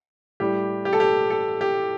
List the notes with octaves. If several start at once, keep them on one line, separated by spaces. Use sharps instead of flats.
A2 G3 G4
G4
A4
G4
A4
G4